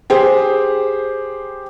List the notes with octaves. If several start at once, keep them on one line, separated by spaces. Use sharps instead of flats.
G4 G#4 C5